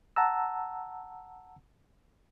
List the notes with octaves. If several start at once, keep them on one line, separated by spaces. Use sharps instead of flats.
F#5 A5 A#5 E6